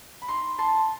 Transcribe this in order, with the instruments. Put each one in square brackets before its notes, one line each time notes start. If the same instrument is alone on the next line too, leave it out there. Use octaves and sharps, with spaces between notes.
[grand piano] B5
[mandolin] D#4 [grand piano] C6
[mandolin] A5 [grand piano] C6